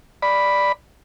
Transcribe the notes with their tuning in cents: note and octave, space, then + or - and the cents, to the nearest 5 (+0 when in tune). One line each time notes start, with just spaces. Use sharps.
D5 +0 B5 +0